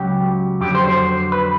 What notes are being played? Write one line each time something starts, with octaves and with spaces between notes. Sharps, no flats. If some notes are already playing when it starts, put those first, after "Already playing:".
Already playing: C#2 C#3 F#3 G4
F2 D3 F#3 G4
C5
C5
B4